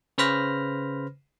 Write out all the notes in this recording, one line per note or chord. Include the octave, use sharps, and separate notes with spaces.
C#3 B4 C5 B5 F6 A#6